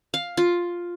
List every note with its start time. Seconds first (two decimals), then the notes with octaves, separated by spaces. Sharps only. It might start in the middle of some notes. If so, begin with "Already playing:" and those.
0.14 F5
0.37 F4